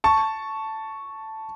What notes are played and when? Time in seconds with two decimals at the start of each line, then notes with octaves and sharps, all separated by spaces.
0.04 A5 C#6